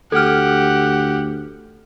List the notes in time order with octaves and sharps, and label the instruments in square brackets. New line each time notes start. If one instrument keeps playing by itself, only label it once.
[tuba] D2 [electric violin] G4 F#5 [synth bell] A4 F6